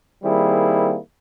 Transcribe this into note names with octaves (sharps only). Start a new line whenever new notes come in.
D#3 G3 A#3 C4 E4 G#4